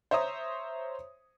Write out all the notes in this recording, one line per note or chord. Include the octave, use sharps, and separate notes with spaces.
C5 C#5 E5 A#5 D#6